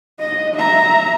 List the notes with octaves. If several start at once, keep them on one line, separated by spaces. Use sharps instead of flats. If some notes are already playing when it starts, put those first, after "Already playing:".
D#5
E5 A#5